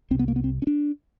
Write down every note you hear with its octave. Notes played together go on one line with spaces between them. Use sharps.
C2 C3 B3 C4
A#3
B3
C4
C#4
D4